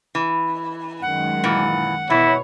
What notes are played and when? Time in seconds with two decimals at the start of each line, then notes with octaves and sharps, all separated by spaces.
0.15 E3
1.02 F#2 D#3 G#3 F#5
1.44 A#2 E3
2.10 B2 E3 E4 C#5